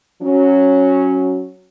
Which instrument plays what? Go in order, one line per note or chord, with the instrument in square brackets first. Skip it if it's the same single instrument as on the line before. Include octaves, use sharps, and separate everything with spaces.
[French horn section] F#3 C#4